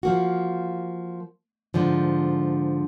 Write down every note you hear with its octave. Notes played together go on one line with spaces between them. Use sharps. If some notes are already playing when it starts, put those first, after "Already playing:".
F3 A#3 F#4
G#2 D3 F3